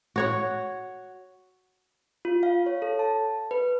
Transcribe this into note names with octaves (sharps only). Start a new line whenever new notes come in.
F#4 C#5 F#5
F4
F5
C#5
A4
A5
B4